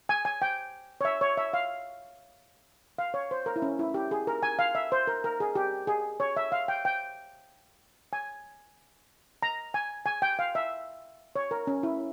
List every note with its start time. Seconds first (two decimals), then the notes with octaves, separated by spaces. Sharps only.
0.09 G#5
0.25 G#5
0.42 G5
1.01 C#5
1.05 E5
1.21 C#5
1.37 E5
1.53 F5
2.98 F5
3.14 C#5
3.31 C5
3.46 A#4
3.56 E4
3.62 C#4
3.79 E4
3.94 G4
4.11 G#4
4.27 A#4
4.43 G#5
4.59 F5
4.75 E5
4.92 C5
5.07 A#4
5.24 A#4
5.40 G#4
5.55 G4
5.87 G#4
6.20 C#5
6.37 E5
6.52 F5
6.68 G5
6.85 G5
8.13 G#5
9.42 A#5
9.74 G#5
10.06 G#5
10.22 G5
10.39 F5
10.55 E5
11.36 C#5
11.51 A#4
11.67 C#4
11.83 E4